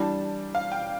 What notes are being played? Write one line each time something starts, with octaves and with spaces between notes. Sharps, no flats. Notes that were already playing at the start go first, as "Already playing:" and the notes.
Already playing: E3 G3 D4 A5
F5
G5